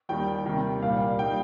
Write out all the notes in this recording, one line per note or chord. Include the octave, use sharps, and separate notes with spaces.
D#2 D#3 G3 D#4 G5
C3 D#3 G3
C2 A#2 G3 A#3 F5
G3 D#4 G5